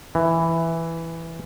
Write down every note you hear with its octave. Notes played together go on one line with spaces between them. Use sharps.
E3